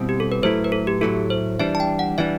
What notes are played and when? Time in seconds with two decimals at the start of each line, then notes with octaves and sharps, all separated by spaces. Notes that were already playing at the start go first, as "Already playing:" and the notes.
Already playing: B2 G3 C4 E4
0.09 G4
0.20 A4
0.32 B4
0.43 A2 F#3 A3 E4 C5
0.64 B4
0.72 A4
0.87 G4
1.01 A2 F#3 A3 E4 A4
1.30 C5
1.59 E3 G3 D4 E5
1.75 A5
1.80 G5
1.99 F#5
2.18 E3 G3 D4 E5